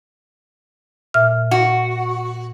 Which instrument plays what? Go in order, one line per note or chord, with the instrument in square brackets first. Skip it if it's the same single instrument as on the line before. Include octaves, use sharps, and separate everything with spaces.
[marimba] A#2 E5 F6
[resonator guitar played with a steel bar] F#4